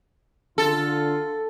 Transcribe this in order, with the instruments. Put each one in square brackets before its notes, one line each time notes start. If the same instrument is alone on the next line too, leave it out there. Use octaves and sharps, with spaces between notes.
[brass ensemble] D3 F4 [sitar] A4